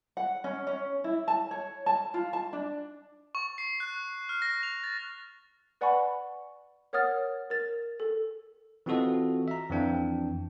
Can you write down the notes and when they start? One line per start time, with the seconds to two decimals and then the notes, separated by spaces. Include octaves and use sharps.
0.17 F#5
0.44 C#4
0.67 C#4
1.04 E4
1.28 A5
1.51 C#5
1.86 A5
2.14 F4
2.33 A5
2.53 D4
3.35 C#6
3.58 C7
3.80 F#6
4.29 F6
4.42 A#6
4.63 F7
4.84 A6
5.81 B4 D5 F#5 G#5 B5 C#6
6.93 A#4 C#5 F#5 D#6 F6 A6
7.50 A#4 A6
8.00 A4
8.86 E3 C4 F4 F#4 A4 D#5
9.48 E5 A#5
9.70 F2 E3 D4 G5